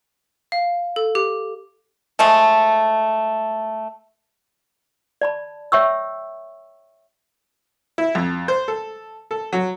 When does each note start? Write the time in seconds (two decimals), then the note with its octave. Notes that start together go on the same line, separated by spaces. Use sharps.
0.52 F5
0.96 A4
1.15 G4
2.19 F3 G#3 A3
5.21 D5 A5 B5
5.72 C#5 E5 G5 C#6 E6
7.98 E4
8.15 F2
8.48 C5
8.68 A4
9.31 A4
9.53 F#3